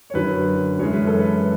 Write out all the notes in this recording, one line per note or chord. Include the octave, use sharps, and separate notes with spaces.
C#5
F#2 D3 F#3 B4
F#2 E3 G#3 C#5
B4
A4
B4